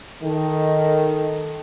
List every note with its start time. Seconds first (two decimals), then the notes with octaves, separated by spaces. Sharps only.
0.23 D#3 A4